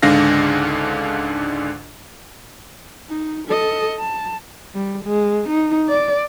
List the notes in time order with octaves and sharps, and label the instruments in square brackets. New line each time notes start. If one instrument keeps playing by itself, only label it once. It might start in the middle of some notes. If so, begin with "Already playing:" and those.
[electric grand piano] C#2 G#2 D3 D4 F5 A#6
[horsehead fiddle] D#4
A4 D#5
A5
G3
G#3
D#4
D5